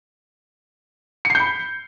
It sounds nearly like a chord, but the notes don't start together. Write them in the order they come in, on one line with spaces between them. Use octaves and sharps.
C#7 C7 G6 B5